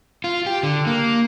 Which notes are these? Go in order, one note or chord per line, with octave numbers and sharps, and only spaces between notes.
F4
G4
D3
A#3